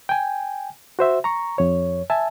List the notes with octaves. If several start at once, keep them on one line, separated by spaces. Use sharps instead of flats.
G5 G#5
F#4 C5 E5
A#5 C#6
F2 C#5
E5 G#5 A5